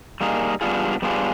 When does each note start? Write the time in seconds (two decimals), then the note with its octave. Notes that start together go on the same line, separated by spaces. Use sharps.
0.21 G3 A#3 D#4 G#4
0.61 G3 B3 D4 F4 G#4
1.02 G3 B3 D4 F4 G#4